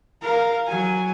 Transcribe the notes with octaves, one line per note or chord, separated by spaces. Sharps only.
A#4 F5
F#3 G#5